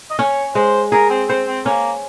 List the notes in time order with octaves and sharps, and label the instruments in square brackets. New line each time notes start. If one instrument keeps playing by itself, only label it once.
[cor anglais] D#5
[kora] C#4 [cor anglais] C#5
[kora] G#3 [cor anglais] C5
[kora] G#4 [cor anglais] A#4
[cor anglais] C4
[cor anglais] C4 [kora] C5
[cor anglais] C4
[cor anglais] A#3 [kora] C#4